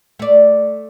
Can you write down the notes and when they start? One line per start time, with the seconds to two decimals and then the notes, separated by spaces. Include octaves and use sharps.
0.19 A3 D5